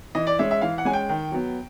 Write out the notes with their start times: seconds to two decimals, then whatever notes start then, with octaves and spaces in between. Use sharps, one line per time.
0.15 E3 D#5
0.27 D5
0.39 G#3 C#4 E5
0.51 E5
0.61 E3 F5
0.78 F#5
0.85 G#3 C#4 G#5
0.93 G5
1.09 D#3
1.32 F#3 B3